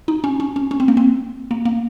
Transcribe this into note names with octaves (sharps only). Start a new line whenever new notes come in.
D#4
C#4
C#4
C#4
C#4
C4
A#3
C4
A#3
A#3